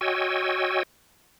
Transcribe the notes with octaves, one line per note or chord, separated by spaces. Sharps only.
F#4 C#5 D#5 G5 G#5 E6